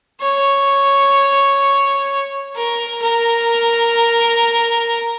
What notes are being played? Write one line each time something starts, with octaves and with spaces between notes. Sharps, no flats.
C#5
A#4
A#4